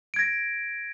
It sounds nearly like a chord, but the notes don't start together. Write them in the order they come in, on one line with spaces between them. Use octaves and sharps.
D7 G#6 A#6